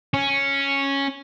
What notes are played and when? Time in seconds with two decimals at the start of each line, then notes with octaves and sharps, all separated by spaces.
0.14 C#4